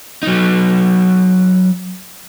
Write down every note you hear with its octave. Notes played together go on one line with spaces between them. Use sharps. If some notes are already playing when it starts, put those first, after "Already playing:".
F#3 D#4